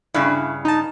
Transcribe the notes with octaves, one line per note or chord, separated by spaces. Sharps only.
G2 C#3 E4
D#4 A5